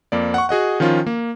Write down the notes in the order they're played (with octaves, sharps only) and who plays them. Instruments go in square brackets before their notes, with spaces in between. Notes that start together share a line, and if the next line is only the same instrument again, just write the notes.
[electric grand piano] F2 A#3 D5
F#5 C#6
F#4 G#4 D#5 F#5
D#3 F3 C#4 F4
A#3